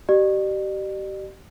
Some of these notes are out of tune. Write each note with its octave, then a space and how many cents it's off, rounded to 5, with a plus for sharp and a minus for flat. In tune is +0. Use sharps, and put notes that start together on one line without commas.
G4 -30 D5 +45